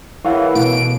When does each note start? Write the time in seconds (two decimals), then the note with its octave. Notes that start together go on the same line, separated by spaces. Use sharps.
0.25 E3 E4 G#4 A#4 C#5 F5 F#5
0.55 B2 A3 D7